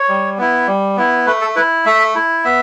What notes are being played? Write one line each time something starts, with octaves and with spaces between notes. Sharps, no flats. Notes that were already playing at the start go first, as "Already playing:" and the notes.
Already playing: C#5
G3
B3 E4
G3
B3 E4
A3 B4
A4
E4 B4
A3 E5
E4
B3 E5